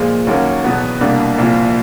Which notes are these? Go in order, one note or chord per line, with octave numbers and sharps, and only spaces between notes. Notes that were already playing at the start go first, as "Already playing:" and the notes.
Already playing: A#2 F3 G#3
D#2 D#3 F#3 A#3 C#4
E2 B2 F#3 B3
C2 B2 G3 A#3 D4
C2 A#2 F3